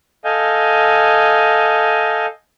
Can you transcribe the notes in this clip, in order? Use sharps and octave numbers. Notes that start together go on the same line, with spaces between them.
A4 D#5 F5 G#5 G6